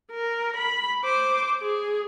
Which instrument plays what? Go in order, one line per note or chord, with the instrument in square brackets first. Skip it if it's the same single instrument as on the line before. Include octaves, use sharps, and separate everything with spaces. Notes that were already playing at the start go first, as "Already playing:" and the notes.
[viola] A#4
B5
C5 D6
G#4